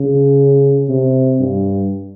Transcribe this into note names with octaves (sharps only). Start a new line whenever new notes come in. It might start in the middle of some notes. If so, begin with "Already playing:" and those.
Already playing: C#3
C3
G2